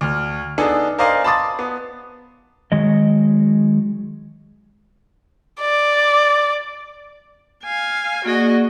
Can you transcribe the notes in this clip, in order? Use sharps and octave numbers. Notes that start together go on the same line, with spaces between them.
D2 F6
B3 D4 D#4 G#4 A4
A#4 C5 D5 D#5 F5 G#5
A5 B5 C6 D6 D#6 A6
B3
D#3 F#3 G#3 D#5
D5
F5 G#5
A#3 F#4 G#4 D5 D#5